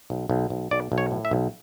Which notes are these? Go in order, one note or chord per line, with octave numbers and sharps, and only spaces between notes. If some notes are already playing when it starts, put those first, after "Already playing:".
B1
B1
B1
B1 D5
B1
C#5
A2
E5
B1